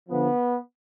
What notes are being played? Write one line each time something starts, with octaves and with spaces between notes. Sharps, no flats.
D3 F3 B3